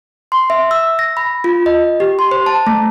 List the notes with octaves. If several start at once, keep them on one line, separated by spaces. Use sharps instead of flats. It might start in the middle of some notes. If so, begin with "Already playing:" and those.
C6
E5
E6
A#6
B5
F4
D#5
G4
C6
C5
A5
A3